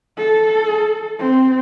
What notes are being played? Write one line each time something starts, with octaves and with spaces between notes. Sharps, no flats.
A4
C4